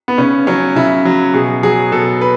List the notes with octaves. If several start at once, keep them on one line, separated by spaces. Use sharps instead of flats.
B3
C#3 C#4
F#3 C#4
C#3 E4
F#3
B2 G#4
F#3 G#4
B2 A4
B4